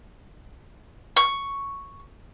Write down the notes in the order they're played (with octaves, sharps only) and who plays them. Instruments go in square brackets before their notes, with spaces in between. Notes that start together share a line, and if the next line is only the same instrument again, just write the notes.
[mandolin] C#6